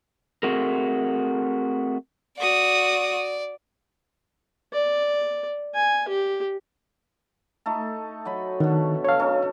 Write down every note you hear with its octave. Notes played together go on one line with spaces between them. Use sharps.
A3 C4 F#4 G#4 A#4
F#4 D5 D#6
D5
G#5
G4
A3 D#4 A4
F#3 D#5 B5
B2 D3 D#3
F#3 A4 C#5 F5
C#4 D#4 A4